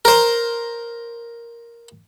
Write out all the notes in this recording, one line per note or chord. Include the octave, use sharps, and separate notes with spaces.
A#4 C5